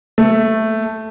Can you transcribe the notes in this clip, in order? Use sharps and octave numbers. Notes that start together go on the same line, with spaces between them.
A3